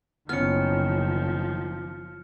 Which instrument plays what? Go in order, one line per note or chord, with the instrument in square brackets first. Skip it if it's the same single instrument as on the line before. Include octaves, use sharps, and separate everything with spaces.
[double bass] F#1 D#3 [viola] F3 [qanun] B3 C#4 [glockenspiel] F6 C#7